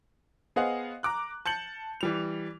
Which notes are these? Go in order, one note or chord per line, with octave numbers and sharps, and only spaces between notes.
B3 G#4 C5 D#5 F5 F#5
A#5 D6 F#6
A5 G6 C#7 F#7
E3 G3 F7